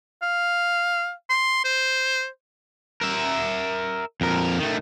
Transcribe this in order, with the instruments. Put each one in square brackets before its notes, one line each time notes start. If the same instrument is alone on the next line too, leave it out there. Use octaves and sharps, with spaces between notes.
[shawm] F5
C6
C5
[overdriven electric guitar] A#4 E5
F2 A#4
D#3 A3